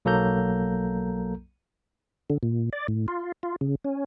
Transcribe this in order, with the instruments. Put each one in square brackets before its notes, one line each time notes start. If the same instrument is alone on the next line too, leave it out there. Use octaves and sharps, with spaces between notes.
[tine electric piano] B1 F#3 A#3 A4 A#5 G6
[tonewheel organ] D3
A#2
D5
A2
F4
F4
C#3
C#4